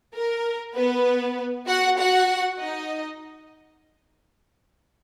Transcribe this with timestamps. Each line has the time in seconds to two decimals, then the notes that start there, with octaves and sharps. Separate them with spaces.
0.13 A#4
0.75 B3 B4
1.66 F#4 F#5
1.97 F#4 F#5
2.59 D#4 D#5